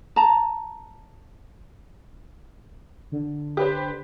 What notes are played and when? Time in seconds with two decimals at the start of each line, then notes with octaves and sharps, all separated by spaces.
0.16 A5 A#5
3.12 D3
3.57 G4 B4 C5